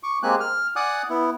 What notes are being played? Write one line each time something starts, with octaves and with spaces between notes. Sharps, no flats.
C#6 D6
G#3 A#3 C4 G4 G#5 F#6
F6
D5 F#5 G#5 D6 D#6 F#6
B3 E4